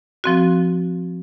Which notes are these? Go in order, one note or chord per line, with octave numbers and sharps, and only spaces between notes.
F3 C4 F#4